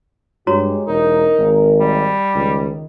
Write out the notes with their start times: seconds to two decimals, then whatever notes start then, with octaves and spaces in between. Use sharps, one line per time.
0.47 G2 G#3 F#4 G4 C#5 A#5
0.87 E1 D#4 A#4
1.38 G#1
1.80 G3
2.35 C#2 D#3